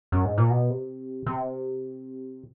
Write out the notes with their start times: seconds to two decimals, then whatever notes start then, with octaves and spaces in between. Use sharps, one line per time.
0.12 F#2
0.25 G#2
0.38 A#2
0.50 B2
0.70 C3
1.26 C3